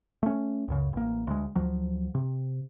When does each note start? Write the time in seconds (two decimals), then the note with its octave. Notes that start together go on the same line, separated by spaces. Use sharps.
0.23 A3 C#4
0.68 C#2 F#2 C#3
0.93 A1 A#3
1.27 D2 G#3
1.56 D2 F3 F#3
2.15 C3